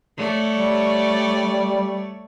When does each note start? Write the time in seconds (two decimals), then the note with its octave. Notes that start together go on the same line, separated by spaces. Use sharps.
0.17 A3 C#5 D5
0.52 G3